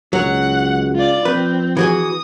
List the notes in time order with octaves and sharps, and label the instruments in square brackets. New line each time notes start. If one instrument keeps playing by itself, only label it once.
[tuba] C#2 [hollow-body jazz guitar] F#3 [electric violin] F#5
[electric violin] F4 D5
[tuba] F3 [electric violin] C4 [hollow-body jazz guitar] B4
[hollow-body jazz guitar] E3 F#4 G#4 [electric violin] D#6